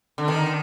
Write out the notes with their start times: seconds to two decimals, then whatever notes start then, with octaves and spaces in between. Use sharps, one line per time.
0.18 D3
0.28 D#3